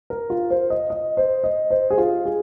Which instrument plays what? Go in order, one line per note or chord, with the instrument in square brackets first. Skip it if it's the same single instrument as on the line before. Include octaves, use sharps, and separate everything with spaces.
[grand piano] A#4
F4
C5
D#5
D#5
C5
D#5
C5
G#4
F4
G#4